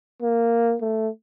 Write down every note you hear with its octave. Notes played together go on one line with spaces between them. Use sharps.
A#3
A3